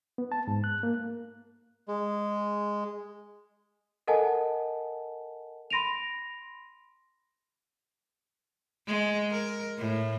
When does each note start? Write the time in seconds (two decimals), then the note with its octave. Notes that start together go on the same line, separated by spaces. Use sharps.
0.18 B3
0.32 A5
0.48 G#2
0.64 F#6
0.83 A#3
1.88 G#3
4.07 A4 A#4 D#5 F#5 G#5 A5
5.70 B5 C6 A#6 D7 D#7 F7
8.87 G#3
9.31 A#4
9.78 A2